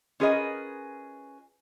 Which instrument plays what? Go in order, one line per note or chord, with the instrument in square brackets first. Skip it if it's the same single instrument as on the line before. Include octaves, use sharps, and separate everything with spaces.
[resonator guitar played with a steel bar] C#4 F4 G#4 A#4 B4 D#5